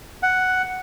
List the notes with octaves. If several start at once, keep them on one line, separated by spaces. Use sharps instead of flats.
F#5